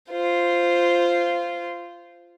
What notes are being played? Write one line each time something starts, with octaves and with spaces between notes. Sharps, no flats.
F4 C5